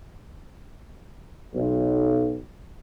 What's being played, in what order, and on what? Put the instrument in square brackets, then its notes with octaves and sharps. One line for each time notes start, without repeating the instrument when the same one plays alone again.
[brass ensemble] B1